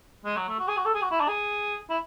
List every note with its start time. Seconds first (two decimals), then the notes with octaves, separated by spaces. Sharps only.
0.25 G#3
0.37 F#3
0.49 A3
0.59 F#4
0.68 G#4
0.77 F#4
0.86 A4
0.95 G#4
1.02 F#4
1.11 E4
1.20 D4
1.28 G#4
1.90 E4